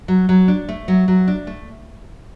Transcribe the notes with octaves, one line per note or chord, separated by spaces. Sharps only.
F#3
F#3
D4
A3
F#3
F#3
D4
A3